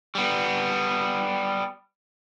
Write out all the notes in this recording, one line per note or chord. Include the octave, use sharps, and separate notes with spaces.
G3 B3